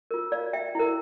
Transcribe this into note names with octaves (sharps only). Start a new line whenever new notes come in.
F4 A#4
D5 F5
E5 G5
E4 A#4